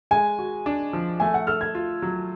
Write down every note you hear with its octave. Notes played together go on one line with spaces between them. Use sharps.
G#3 G#5
F#4
D4
F3
A3 G#5
F#5
A4 F6
G#6
F4
F#3